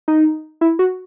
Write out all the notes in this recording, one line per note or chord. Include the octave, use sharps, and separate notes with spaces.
D#4
E4
F#4